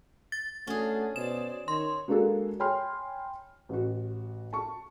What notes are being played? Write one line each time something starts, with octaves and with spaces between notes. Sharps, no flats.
A6
A3 C#4 D4 F#4 G#4
B2 C5 D5 E7
D#3 C#5 C6
G#3 A#3 D4 F#4 G#4 A4
C#5 G5 G#5 B5 C6 F6
A1 F#4
A5 C#6